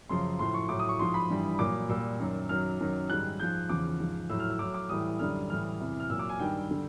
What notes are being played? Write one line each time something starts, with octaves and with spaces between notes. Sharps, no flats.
F#2 C#3 F3 C6
A2 F3 C6
C#6
A2 F#3 D6
D#6
C#6
G#2 F3 C6
B5
G2 E3 G3
A#2 F#3 D6
A#2 G3 E6
F#2 D#3 F#3
F#2 D#3 F#3 F6
F#2 D#3 F#3
G#2 D#3 G3 F#6
G#2 F3 G6
E2 C#3 F3 D6
G#2 F3
A2 F#3 E6
F6
E6
A2 F#3 D6
D6
A2 E3 G3 D#6
F#2 D3 G3 F6
A2 E3 G3 F6
E2 C3 E3
F6
A#2 F#3 E6
D6
G#5
G2 D#3 G3 G5
D3 G3